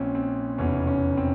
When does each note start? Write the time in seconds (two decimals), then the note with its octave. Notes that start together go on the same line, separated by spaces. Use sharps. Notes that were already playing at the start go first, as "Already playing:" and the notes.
Already playing: A#1 A#2 C4 C#4
0.15 C4
0.58 F1 E2 B2 C#4
0.87 C#4
1.17 C4